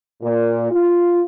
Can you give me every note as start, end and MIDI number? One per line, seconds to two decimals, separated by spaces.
0.22 0.69 46
0.71 1.20 65